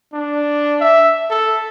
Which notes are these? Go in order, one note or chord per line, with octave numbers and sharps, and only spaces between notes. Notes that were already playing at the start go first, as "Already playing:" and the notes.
D4
E5
A4